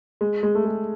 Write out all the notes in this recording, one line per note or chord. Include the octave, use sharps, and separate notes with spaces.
G#3
G#3
A3
G#3